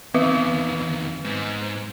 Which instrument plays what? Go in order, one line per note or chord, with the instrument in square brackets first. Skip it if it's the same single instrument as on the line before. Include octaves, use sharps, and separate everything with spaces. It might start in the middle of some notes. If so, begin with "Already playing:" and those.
[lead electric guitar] E2 D#3 [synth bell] B3 C4 B4
[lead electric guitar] G#2